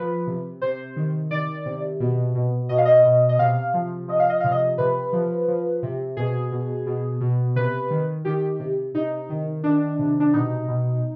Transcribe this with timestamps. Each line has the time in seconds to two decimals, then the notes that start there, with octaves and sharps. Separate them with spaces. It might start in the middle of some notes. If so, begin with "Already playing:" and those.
Already playing: F3 B4
0.27 C3
0.62 C3 C5
0.96 D#3
1.31 D#3 D5
1.66 C3
2.00 B2
2.35 B2
2.69 B2 D#5
2.78 F5
2.85 D#5
3.05 B2
3.29 D#5
3.39 C3 F5
3.74 F3
4.08 F3 D#5
4.19 F5
4.30 D#5
4.40 C3 F5
4.51 D#5
4.78 C3 B4
5.13 F3
5.48 F3
5.83 C3
6.17 B2 G#4
6.52 B2
6.86 B2
7.21 B2
7.56 C3 B4
7.90 D#3
8.25 D#3 G4
8.60 C3
8.95 C3 D#4
9.30 D#3
9.64 D#3 D4
9.99 C3
10.20 D4
10.34 B2 D#4
10.68 B2